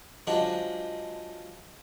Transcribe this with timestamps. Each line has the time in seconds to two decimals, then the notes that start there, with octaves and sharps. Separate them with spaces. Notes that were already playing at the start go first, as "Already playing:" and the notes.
0.27 F3 F#3 G#3 D4